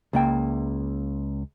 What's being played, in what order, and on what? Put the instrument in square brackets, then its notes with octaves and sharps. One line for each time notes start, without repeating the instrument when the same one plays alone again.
[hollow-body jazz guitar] C#2 A#3 G5